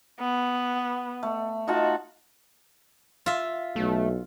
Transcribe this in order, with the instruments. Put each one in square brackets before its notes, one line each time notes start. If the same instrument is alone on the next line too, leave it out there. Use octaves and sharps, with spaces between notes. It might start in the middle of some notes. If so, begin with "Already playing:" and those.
[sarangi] B3
[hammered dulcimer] A3
[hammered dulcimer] D#4 F4 A5 [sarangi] F#4
[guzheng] F4 E5
[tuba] B1 [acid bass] A3